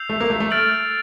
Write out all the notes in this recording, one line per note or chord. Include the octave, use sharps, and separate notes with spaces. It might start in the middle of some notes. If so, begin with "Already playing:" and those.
Already playing: E6 G6 C7 F7
A3
A#3
A3
A3
F6 A6 D7 F#7